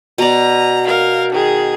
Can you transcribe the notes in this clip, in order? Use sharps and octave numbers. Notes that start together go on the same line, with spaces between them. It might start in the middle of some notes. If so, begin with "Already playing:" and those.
B2 D5 A#5
A#4 F5
D#3 G#4